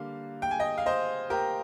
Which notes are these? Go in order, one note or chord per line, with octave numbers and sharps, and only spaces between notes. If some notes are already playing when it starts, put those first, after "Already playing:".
Already playing: D3 G3 A#3 F5
G5
G#5
D#5 G5
F5
C5 D#5
G4 A#4